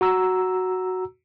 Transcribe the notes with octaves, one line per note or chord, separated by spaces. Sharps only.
F#4 A#5 E6